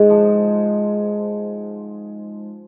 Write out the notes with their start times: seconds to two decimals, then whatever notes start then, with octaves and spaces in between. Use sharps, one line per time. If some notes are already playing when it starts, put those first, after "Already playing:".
Already playing: G#2 G#3
0.10 F3